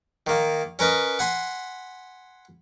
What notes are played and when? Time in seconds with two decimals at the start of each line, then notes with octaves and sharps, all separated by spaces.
0.27 D#3 A#3
0.79 C#4 A#4 B4 D#5
1.19 F#5 G#5 B5 C6